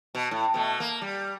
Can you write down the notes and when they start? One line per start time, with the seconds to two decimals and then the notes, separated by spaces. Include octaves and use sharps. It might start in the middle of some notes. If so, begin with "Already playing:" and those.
0.15 B2
0.31 A2
0.54 B2 A3
0.80 A#3
1.01 G3